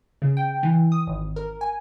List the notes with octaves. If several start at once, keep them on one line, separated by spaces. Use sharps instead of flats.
C#3
G5
E3
D#6
G#1
A#4
G#5